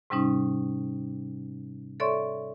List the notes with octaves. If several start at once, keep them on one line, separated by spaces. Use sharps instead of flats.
G#2 C3 G3 C#4 D#4
A4 C#5 D5 E5 C6 C#6